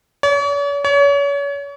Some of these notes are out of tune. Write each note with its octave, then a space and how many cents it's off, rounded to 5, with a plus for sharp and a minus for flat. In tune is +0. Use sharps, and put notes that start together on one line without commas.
C#5 +45
C#5 +35